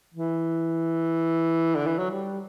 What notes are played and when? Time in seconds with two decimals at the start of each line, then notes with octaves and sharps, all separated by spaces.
0.14 E3
1.75 D3
1.87 E3
1.98 F#3
2.10 G3